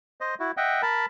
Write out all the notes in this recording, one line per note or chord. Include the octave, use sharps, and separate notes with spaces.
C5 D#5
E4 F#4
D#5 E5 F#5 G5
A#4 A5 B5